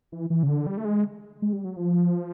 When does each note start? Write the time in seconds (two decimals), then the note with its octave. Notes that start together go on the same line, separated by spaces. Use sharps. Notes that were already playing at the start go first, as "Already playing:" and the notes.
0.12 E3
0.30 E3
0.43 C#3
0.49 D3
0.67 G3
0.77 A3
0.85 G#3
1.42 G#3
1.53 G3
1.65 F#3
1.77 F3